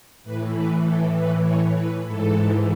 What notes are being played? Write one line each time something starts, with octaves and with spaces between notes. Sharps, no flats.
A2 E3 B4
B4
A4
B4
C#5
B4
G#2 E3 A4